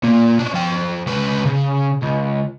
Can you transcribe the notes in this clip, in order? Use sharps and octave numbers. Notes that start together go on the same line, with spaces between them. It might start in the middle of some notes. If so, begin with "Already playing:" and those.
A#2 A#3
C#4 D4
F3 G5
C#2 B4
C#3
C#2